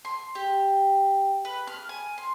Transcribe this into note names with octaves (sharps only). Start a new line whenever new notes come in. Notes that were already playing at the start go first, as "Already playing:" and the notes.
C6
G4
B4
F6
G#5
C6